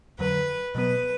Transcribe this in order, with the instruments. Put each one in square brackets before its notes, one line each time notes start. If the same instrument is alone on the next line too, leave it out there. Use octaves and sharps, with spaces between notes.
[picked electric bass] F2 D3 F#3 [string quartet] B4
[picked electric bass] B2 F#3 B3 [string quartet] B4